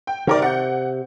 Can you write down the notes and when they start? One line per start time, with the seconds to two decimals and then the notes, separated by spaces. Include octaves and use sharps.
0.07 G5
0.27 C3 D#3 A#4 D5
0.42 F#5 G6